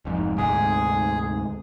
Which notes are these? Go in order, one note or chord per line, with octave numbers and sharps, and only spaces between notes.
F1 F2 G#2
D2 G#2 C3 G#4